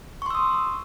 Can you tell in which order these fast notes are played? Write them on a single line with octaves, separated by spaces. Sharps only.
C#6 C6 E6 D#6